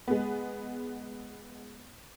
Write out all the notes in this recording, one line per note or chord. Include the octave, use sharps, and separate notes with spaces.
G#3 B3